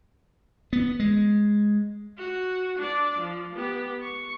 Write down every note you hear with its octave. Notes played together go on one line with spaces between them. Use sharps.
B3
G#3
F#4
D4 D5
F3
B3 G4
C#6